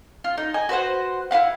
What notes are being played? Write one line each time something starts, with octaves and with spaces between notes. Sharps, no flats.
F4
D#4
D#5 G#5
F#4 B4 C5 F#5
E4 B4 F5 F#5